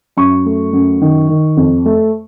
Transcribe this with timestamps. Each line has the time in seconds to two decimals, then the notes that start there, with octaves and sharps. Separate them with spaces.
0.17 F#2 C#6
0.46 A3
0.73 F#2
1.01 D#3
1.29 D#3
1.57 F2
1.86 A3